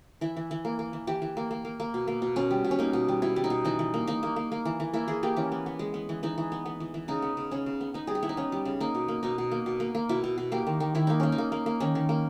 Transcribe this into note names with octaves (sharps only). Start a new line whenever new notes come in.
E3 E4
E3
E3
A#3
A#3
E3
E3 G4
E3
A#3
A#3
A#3
A#3
B2
A#3
B2
B2 C#4
G3
B2
C#4
A#3 D#4
B2
G3
B2 E4
G3
D#4
B2
E3 D#4
E3
A#3
A#3 D#4
A#3
A#3
A#3
E3
E3
A#3 E4
E3 G#4
A#3 G4
E3 C#4
B3
B3
G#3
B3
E3
E3 D#4
E3
B3
B3
E3
E3
C#3 D#4
B3
C#3
C#3 C#4
C#3
B3
B3 D#4
G3 G#4
G4
B3 E4
D#4
B3 C#4
G3
C#3
A#3 D#4
B2
A#3
B2 D#4
B2
A#3
B2
A#3
A#3
B2 E4
B2
B2
A#3 G4
D#3
D#3
D#3 E4
A#3 D#4
A#3 C#4
D#4
A#3
A#3
A#3
D#3 C#4
D#3
A#3